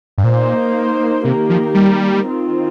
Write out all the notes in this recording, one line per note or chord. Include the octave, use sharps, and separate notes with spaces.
G2
A#2 A#3 D#4 C5
C3 D#3 A#3 G4 A#4
F3
G3
D#3 C4 F4